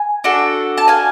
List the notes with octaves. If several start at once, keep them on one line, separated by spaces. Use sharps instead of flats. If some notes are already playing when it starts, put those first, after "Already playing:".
Already playing: G#5
D4 F#4 A4
A5
F5 G#5